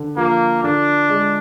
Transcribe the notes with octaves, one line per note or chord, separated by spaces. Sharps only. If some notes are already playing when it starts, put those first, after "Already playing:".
Already playing: D3
F3 A#3
D3 D4
G#3